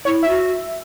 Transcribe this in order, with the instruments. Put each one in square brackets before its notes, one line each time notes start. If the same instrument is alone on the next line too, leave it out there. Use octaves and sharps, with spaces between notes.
[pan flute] E4 [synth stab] C#5
[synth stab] E5
[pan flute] F#4